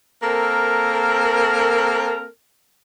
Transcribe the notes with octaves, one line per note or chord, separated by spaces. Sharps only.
A#3 C4 A4 A#4